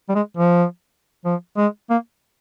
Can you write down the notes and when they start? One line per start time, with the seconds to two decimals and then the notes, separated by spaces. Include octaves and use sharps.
0.09 G3
0.15 G#3
0.37 F3
1.25 F3
1.57 G#3
1.90 A#3